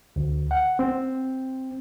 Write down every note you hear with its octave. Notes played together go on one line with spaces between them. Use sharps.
D2
F#5
C4